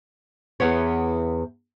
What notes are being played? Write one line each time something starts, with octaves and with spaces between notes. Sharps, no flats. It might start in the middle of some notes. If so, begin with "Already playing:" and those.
E2 B3 E4 C#5